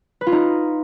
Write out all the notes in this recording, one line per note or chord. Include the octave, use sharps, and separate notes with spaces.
B4
F4
D#4